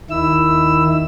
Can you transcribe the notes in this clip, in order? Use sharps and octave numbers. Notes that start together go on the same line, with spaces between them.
D#2 D#3 E4 E6